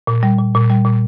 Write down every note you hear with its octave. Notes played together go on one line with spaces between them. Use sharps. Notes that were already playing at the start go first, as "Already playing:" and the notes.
A#2
G3
A#2
A#2
G3
A#2